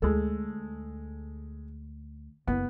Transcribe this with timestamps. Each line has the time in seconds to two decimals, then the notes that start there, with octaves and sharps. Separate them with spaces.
0.02 D2 G#3 A4
2.47 F#1 B3